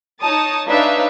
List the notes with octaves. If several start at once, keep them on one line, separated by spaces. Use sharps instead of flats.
D#4 C#5 A5 D#6
D4 D#4 B4 C#5 E5 F5